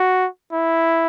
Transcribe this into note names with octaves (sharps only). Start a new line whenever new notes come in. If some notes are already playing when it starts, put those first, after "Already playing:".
Already playing: F#4
E4